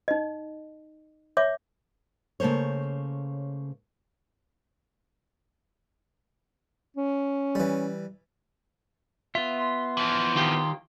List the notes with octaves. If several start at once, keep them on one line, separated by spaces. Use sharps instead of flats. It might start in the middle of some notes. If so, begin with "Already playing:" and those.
D#4 D#5
C#5 E5 D6
C#3 A3 A#3 C5 C#5
C#4
E3 G3
B3 F4 E5
C6
E3 F3
D#3 F4 G4